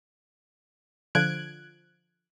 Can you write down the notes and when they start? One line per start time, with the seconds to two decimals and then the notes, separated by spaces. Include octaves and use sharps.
1.15 D3 F3 F#6 G#6 D7